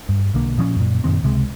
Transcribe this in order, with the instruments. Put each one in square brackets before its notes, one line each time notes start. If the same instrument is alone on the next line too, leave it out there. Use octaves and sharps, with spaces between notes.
[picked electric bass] G2
B1 D3 A#3
A#2 F3 C4 C#4
F#2 A#2
F#2 A#2 D#3 C4
C#2 C3 G#3